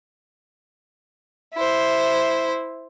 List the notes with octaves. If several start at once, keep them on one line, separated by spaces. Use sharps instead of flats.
E4 C5